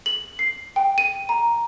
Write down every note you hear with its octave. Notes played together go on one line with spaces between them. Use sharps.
F#7
C7
G5
D#7
A#5